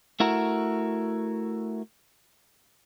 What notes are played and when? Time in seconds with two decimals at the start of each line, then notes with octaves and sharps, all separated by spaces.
0.20 A3 E4 F#4 A#4